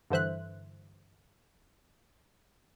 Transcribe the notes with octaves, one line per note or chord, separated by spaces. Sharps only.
G2 D3 E3 C5 E5 F#6